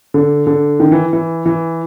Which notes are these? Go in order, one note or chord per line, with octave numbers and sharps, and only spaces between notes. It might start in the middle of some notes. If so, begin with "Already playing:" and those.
D3
D3
D#3
E3
E3
E3